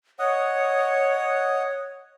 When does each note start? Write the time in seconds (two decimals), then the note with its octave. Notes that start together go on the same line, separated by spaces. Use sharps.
0.19 C#5 D#5 F#5 D#6